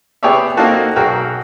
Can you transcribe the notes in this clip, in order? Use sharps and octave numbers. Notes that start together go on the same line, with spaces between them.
B3 G4 G#4 C#5 D5 E5
A#3 C4 D#4 F4 F#4 A4
B1 F#4 G#4 A#4 G5